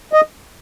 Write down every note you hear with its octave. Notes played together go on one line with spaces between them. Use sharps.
D#5